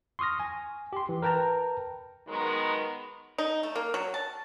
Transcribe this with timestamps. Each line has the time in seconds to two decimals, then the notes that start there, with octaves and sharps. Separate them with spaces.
0.19 C6 C#6 D#6 F6 A#6
0.40 G#5
0.93 G4 C6
1.09 E3
1.22 A#4 B4 G5 A5 A#5
2.28 D#3 F#3 G#3 B3 A#4
3.38 D#4
3.63 A3
3.76 A#3
3.94 F#3
4.14 A5